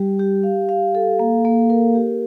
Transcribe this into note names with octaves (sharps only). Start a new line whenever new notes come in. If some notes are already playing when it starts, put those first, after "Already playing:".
Already playing: G3 G4
G4
F5
F5
A4
A#3
A#3
A#4
G4